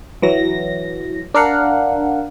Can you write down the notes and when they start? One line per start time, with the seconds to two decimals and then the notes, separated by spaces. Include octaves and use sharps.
0.22 E3 F#3 A#6
1.34 D4 A#4 F5 F#5